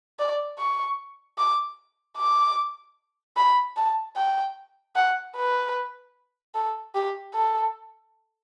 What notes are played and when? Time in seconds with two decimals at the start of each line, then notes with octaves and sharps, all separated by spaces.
0.19 D5
0.58 C#6
1.38 D6
2.17 D6
3.37 B5
3.77 A5
4.16 G5
4.95 F#5
5.36 B4
6.55 A4
6.95 G4
7.34 A4